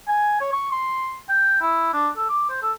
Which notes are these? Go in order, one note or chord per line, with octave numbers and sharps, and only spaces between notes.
G#5
C#5
C#6
C6
G5
E4
D4
A4
D6
C5
A4